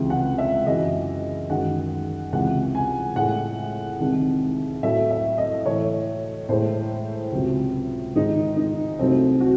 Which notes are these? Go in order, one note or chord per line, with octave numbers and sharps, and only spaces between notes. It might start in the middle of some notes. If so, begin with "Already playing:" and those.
Already playing: C#2 C3 E3 G#3
F#5
E5
F#2 E3 G#3 D#5
F#2 D#3 G#3 F#5
C#2 C3 E3 G#3 F#5
G#5
A2 G#3 F#5
C2 C3 D#3 G#3
A2 F#3 A3 E5
E5
D#5
A2 E3 A3 C#5
A2 G#3 C5
C#2 C3 F#3
G#2 D#3 G#3 D#4
D#4
C2 C3 F#3 A3 C4
F#4